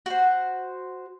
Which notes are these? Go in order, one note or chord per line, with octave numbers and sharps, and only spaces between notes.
F#4 C5